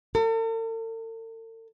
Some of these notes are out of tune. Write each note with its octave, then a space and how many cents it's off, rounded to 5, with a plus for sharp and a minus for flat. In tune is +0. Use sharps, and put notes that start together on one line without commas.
A4 +45